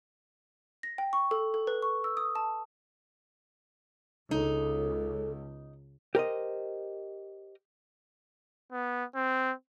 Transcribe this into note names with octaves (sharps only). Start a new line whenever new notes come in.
A#6
G5
C#6
A4
A4
B4
C#6
E6
D#6
A5
C#2 D#4 A4
G4 A#4 C5 D#5
B3
C4